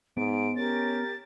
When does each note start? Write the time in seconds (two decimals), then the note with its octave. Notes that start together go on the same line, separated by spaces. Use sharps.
0.17 G#2 B3 D7
0.56 C#4 G4 A#4 C#5 A6